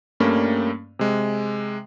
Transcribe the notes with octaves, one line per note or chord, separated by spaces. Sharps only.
G2 G3 A3 A#3 C#4
C3 G#3